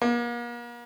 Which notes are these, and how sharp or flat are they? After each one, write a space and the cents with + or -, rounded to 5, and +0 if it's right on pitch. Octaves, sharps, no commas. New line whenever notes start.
A#3 +40